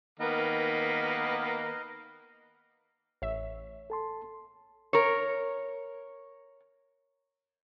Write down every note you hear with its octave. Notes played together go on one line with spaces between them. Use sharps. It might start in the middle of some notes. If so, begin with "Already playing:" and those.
D#3 A#3 B3 A#4 B4 D#5
A1 C#5 E5
A4 A5 C6
A#4 C#5